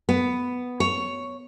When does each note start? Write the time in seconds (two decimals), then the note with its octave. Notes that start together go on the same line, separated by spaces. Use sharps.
0.09 B3
0.80 C#5